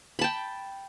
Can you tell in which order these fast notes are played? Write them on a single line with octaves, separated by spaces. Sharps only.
B5 A5 G5